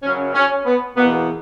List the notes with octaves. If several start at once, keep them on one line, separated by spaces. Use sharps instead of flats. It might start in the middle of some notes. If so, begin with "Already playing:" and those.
F#2 C#3 F#3 C#4
C#4
B3
E2 B2 A#3 B3